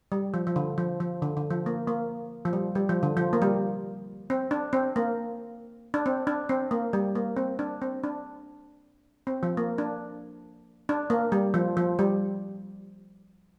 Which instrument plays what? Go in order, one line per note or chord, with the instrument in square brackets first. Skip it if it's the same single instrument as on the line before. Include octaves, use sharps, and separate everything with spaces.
[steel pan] G3
F3
F3
D3
F3
F3
D3
D3
F3
A#3
A#3
F3
G3
G3
F3
D3
F3
A#3
G3
C4
D4
C4
A#3
D4
C4
D4
C4
A#3
G3
A#3
C4
D4
C4
D4
C4
F3
A#3
D4
D4
A#3
G3
F3
F3
G3